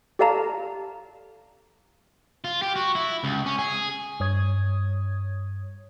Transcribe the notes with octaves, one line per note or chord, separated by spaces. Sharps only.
G4 A4 D5 F5 A5 A#5
F4
G4
F#4
E4
C#2
C#4
G#4
G2 C#5 D#6 G#6